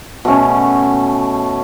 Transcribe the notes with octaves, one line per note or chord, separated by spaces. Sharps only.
B2 A3 C#4